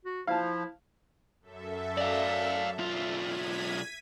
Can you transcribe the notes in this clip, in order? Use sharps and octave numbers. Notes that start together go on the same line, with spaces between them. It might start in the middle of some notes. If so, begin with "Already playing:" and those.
F#4
F3 E4 F5 A5
F#2 A4 E5
D5 F5
B1 F4 E5 F5
G#6 B6 D#7